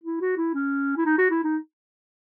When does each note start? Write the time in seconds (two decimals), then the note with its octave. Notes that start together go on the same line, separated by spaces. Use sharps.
0.04 E4
0.21 F#4
0.37 E4
0.55 C#4
0.97 E4
1.05 D#4
1.18 F#4
1.31 E4
1.44 D#4